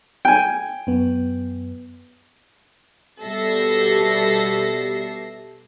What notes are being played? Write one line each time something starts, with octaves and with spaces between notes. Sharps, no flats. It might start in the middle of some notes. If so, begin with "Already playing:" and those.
G5 G#5
F#2 B3
B2 G3 A4 E5 A#6 C7